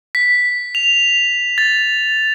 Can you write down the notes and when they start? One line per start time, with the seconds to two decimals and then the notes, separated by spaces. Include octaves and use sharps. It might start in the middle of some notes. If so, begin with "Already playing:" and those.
0.15 B6
0.75 F7
1.58 A6